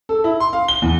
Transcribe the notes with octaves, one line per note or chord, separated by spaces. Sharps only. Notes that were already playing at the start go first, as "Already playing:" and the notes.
A4
E4
C6
F5
G7
E2